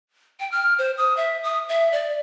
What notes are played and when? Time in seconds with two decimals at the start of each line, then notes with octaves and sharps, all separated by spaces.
0.40 G5
0.52 F6
0.79 C5
0.97 D#6
1.17 E5
1.44 D#6
1.69 E5
1.92 D5